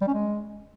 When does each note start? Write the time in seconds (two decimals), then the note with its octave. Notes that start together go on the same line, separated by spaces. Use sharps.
0.01 G3
0.08 C#4
0.14 G#3